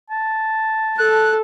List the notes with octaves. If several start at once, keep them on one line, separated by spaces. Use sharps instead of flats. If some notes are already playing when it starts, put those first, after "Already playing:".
A5
A4 F#6